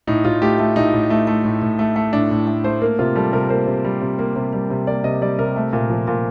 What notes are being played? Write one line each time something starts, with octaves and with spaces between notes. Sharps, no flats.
A2 D#4
A2 F4
A3 G4
A3
A2 D#4
A2
A3
A3
A2
A2
A3
A3
A2 D4
A2
A3
A3 C5
A#3 A#4
C3 F4
G3 A4
C3 A#4
A#3 C5
C3
G3
C3
A#3
C3
G3
C3
A#3 D5
C3 D#5
G3 D5
C3 A#4
A3
A#2
F3
A#2